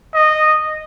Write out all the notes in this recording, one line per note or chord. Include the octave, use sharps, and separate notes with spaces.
D#5